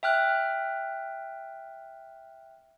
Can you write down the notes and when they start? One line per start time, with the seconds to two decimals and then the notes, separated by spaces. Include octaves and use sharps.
0.03 E5 G5 F6 F#6